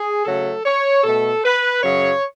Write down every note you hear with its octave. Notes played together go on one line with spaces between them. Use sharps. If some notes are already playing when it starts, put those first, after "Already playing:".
Already playing: G#4
C#3 F#3 A3 A4
C#5
B2 A3 A4
B4
F#2 C#3 F#3 C#5